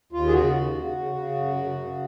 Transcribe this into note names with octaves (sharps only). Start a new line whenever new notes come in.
D#2 F4
G#4
C#3 F#4
D#2
C#3
C#3
C#3
F#2
C#3
C#3